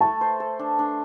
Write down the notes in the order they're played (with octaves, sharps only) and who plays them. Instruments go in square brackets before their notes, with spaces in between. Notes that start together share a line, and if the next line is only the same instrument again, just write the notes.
[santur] A3 [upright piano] A5
[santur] C5
A4
D4
D4